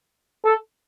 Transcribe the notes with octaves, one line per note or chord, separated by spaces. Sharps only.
A4